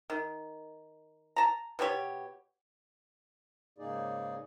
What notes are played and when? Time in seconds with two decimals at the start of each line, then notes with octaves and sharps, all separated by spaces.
0.10 D#3
1.36 A5 A#5
1.79 B2 B3 G4 C#5
3.78 G#2 C#3 A#3 D#4 G#4 D5